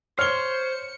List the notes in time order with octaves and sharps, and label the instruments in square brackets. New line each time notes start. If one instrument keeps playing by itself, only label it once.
[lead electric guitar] C5 [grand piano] C#5 G7 [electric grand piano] F6 [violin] C#7